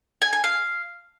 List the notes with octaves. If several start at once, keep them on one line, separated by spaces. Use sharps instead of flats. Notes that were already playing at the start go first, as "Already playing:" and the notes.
G#5
G#5
F5